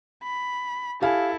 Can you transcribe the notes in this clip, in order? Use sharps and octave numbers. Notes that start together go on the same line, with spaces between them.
B5
E4 G4 A4 F5 G#5